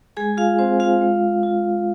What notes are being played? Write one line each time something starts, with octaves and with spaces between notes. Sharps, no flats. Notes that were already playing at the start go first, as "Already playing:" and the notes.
G#3 G#4 G#5
F4 F5
C4 F4 C5
F4 F5
G#3
F4